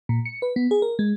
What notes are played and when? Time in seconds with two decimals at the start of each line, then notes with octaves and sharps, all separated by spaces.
0.09 A#2
0.25 C#7
0.42 B4
0.56 B3
0.71 G#4
0.82 A#4
0.99 G#3